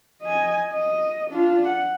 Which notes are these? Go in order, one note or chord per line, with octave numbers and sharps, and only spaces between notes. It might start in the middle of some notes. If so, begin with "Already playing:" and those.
D#5 G#5
D#5
D4 F4
F#5